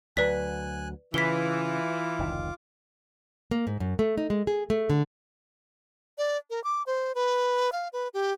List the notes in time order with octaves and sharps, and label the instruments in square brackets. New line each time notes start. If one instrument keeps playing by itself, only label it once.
[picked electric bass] D2 F#3 [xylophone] B4 D5 B6 [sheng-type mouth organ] G#5 F#6
[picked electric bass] C#3 [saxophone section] E3 [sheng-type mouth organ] F4 D6 [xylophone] B6 G7
[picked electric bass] F1 C#2 D#3
[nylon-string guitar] A#3
G#2
F#2
A3
D#4
G#3
G#4
A3
D3
[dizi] D5
A#4
D6
C5
B4
F5
B4
G4